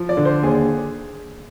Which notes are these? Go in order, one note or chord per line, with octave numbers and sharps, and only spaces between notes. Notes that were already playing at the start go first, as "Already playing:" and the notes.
Already playing: F3
D5
D3
C5
D#2 G#4